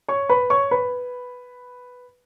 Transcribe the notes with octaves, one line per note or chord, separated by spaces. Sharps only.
C#5 C#6
B4 B5
C#5 C#6
B4 B5